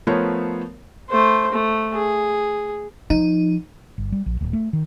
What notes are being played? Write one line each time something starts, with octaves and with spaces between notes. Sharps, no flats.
F3 A3 B3 A#4 C5 C#5
A3 C5
A3
G#4
F3 D#4
G1
G3
A#1
D1
A3
D#3